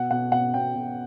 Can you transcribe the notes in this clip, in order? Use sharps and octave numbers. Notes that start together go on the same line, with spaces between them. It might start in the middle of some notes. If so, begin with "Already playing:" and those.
Already playing: B2 F#5
B2 F#5
B2 F#5
B2 G5
B2